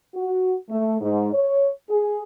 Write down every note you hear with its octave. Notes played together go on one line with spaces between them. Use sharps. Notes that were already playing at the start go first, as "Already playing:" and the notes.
F#4
A3
G#2
C#5
G#4